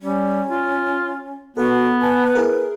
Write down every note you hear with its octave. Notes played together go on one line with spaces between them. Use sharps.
G3 C#4
F4
B3 F#4 A4 B4 F#5
B4 G#5 A5
E4 G#4 A#4